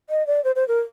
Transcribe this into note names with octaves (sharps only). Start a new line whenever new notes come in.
D#5
D5
C5
C5
A#4